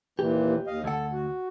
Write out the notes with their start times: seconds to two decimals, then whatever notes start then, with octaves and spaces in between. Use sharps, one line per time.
0.19 D#2 A#2 E3 G4
0.67 D#2 D#5 F5
0.84 D2 A4 F#5
1.13 F#4